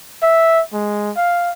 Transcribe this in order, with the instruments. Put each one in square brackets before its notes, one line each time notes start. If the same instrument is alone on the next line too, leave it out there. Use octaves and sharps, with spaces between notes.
[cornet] E5
G#3
F5